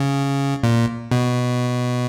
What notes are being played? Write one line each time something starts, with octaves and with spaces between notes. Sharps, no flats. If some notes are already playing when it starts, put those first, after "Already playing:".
Already playing: C#3
A#2
B2